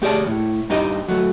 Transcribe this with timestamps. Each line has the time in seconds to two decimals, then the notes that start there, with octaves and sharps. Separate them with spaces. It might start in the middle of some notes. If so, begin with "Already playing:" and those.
0.02 A3 G4 G#4 D5 A5
0.27 A2
0.70 G2 D#4 G4 D#5
1.09 F#3 A3